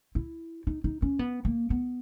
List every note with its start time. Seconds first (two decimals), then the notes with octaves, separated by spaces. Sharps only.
0.15 E4
0.67 D#4
0.84 D#4
1.02 C#4
1.19 B3
1.45 A#3
1.70 B3